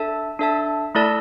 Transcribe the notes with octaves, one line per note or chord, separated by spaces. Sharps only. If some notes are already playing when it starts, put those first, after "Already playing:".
Already playing: D4 A4 E5 A5
D4 A4 E5 A5
A3 E4 A4 D5 A5